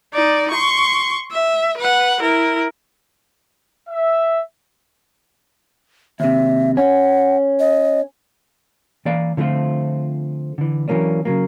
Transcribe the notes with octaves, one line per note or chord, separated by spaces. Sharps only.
D#4 D5
C6 C#6
E5
B4 F#5
E4 A#4
E5
D#2 C3 E5
C#4 F#5
D#5
E3 A#3 D5 F5
D3 F3 A3 C4 F4
D3 E3
E3 F#3 A#3 C#4 D4
C#3 F#3 A#3